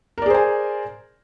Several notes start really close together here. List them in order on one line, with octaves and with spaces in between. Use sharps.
A#4 D5 G#4 C5 G#5